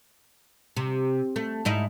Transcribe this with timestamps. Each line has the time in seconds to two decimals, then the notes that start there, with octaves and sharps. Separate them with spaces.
0.76 C3
1.36 A3
1.65 G#2 D#4 E4